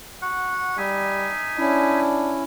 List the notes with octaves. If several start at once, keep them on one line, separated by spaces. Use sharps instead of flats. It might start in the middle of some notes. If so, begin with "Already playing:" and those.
F#4 F#5
G3 D#4 E5 G#5
C#4 D4 E4